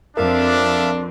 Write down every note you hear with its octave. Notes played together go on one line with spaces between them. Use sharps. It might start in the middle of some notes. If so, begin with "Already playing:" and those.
F2 C4 D4 A#4 E5 F5 A5